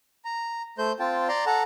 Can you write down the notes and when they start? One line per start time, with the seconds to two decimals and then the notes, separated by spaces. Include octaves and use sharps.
0.25 A#5
0.78 A3 C5 G6
0.99 C4 F4 G5 A5
1.29 D5 A#5 C6
1.46 A4 F#5 A5 A#5